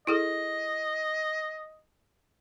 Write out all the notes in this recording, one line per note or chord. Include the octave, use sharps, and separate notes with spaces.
E4 G#4 A4 D#5